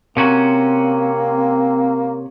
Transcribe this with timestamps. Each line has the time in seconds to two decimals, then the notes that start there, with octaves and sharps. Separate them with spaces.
0.17 C3 A#3 C4 C#4 F#4